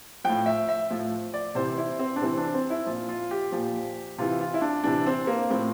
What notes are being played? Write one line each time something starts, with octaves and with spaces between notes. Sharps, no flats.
A2 F3 G5
E5
E5
A2 F3
D5
C3 E3 C5
E4
C4
D4
C3 E3 C4
D4
C4
E4
A#2 F3 F4
F4
G4
A#2 F3
C3 E3 F4
F4
E4
D4
C3 E3 D4
C4
A#3
A2 F3 C4